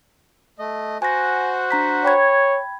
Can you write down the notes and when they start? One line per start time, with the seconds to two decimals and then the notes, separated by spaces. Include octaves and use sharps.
0.59 A3 D#5
1.02 F#4 C5 F#5 G#5 A#6
1.71 D4 A#5 B6
2.05 C#5 G5 B5 G#6